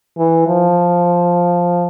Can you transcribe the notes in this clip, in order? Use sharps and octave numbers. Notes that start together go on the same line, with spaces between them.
E3
F3